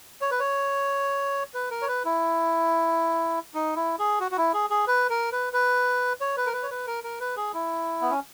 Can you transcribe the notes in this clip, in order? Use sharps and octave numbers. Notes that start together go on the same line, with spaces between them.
C#5
B4
C#5
B4
A#4
C#5
B4
E4
D#4
E4
G#4
F#4
F#4
E4
G#4
G#4
B4
A#4
B4
B4
C#5
B4
A#4
B4
C#5
B4
A#4
A#4
B4
G#4
E4
B3
C#4